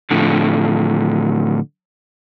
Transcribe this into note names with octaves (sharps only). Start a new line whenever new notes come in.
A2 D3 F3